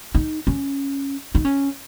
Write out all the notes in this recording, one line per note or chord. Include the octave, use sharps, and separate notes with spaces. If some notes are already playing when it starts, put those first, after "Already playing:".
D#4
C#4
D#4
C#4